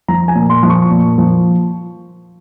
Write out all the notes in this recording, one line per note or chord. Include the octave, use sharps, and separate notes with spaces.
F3 A#5
G#5
A#2
C6
F3
C#6
A#2
F3